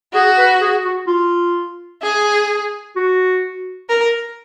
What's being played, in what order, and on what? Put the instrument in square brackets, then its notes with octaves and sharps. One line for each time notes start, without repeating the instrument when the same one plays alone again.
[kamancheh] F#4 [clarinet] G#4
[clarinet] B4
G#4
F#4
F4
[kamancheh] G#4
[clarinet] F#4
[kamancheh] A#4